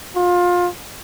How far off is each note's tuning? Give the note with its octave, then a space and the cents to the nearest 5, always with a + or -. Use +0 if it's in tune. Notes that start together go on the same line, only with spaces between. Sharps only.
F4 +25